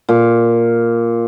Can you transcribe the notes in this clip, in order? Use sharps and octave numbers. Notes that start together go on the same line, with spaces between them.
A#2